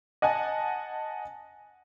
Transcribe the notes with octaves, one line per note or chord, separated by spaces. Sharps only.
D#5 F#5 G#5 A5